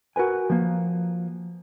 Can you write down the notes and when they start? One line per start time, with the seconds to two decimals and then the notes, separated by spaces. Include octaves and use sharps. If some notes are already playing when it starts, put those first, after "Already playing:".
0.16 F#4 A#4 B4 G#5
0.50 F3 A#3